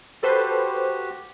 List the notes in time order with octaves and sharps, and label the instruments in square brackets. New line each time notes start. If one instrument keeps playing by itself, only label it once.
[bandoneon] F#4 G4 [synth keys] A4 B4 C5